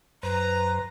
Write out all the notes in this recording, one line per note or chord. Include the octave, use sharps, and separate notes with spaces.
F#2 B4 C5 A#5